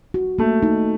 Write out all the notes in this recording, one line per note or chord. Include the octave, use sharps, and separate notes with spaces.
F#4
A3 A#3
D#4